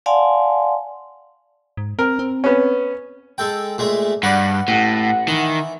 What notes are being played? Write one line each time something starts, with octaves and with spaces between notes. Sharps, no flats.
D5 F5 F#5 G#5 A5 C6
G#2
C4 A#4
C4
B3 C#4
G#3 A4 G5
A#2 G#3 A3
G2 B4 D5 F#5
A1 A2
D#3 E3